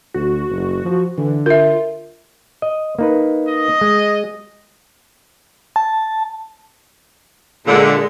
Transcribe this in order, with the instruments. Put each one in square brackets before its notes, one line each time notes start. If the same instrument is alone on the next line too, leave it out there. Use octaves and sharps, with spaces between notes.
[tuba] D2 [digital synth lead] F#4
[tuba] F#1
F3
[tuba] D3 [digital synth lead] E3
[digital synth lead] F4 [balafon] A#4 E5
[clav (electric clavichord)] D#5
A#3 D#4 B4
[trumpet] D#5
[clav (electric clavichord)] G#3
[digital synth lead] A5
[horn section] A#2 D3 [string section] G#3